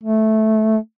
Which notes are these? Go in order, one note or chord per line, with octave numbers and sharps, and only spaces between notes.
A3